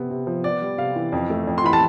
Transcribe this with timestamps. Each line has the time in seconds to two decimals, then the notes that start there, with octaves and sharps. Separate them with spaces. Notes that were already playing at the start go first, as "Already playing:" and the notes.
Already playing: C3 B3
0.10 C3
0.27 F3
0.44 B3 D5
0.62 G3
0.78 C3 F5
0.96 E3
1.12 F2
1.30 A3
1.47 F2
1.58 C6
1.64 E3 B5
1.73 A5